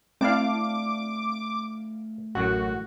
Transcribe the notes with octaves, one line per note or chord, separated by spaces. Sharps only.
A3 C4 D4 E4 D5 F5 D6
A1 F#2 A2 F#4